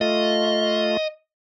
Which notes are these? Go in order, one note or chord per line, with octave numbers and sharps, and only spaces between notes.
A3 F4 D#5